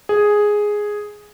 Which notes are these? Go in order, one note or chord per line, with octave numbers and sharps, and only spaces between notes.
G#4